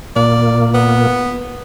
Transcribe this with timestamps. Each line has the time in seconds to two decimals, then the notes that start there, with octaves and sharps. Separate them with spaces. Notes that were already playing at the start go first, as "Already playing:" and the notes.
0.16 A#2 A#3 D5
0.74 B3